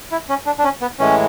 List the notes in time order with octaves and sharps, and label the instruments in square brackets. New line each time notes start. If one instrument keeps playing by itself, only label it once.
[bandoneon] E4
C#4
D4
D4
C#4
B3
A2 E3 G#3 C#4